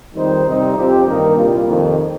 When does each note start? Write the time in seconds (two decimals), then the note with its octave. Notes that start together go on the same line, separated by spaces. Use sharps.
0.14 F2 D#3 G3 D#4 C5
0.45 C3 G3 C4 D#4 C5
0.75 F2 F3 C4 G4
1.05 G2 D#3 A#3 D#4 A#4
1.36 C2 A#2 G3 A#3 F4
1.67 F2 C3 D#3